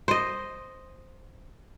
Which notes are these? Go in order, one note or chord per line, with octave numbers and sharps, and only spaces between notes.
C5 D#5